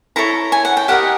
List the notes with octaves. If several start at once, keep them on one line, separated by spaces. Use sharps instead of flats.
E4 A4 C#5 A#5
G#5
F#5
G5
G4 A#4 D#5 F#5